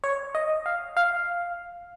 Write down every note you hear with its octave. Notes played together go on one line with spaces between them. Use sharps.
C#5
D#5
F5
F5